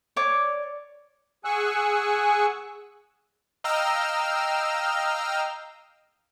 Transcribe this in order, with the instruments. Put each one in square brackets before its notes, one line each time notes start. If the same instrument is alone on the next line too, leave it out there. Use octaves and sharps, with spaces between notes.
[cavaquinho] C#5 D5 D6
[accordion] G#4 F#5 G#5 C#6 E6 F#6
[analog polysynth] D#5 F5 G5 A#5 E6 F6